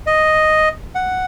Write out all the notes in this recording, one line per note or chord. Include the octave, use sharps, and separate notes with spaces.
D#5
F#5